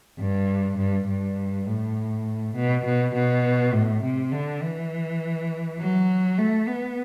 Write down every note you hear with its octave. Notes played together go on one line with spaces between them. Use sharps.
G2
G2
G2
A2
B2
B2
B2
A2
C3
D3
E3
F#3
A3
B3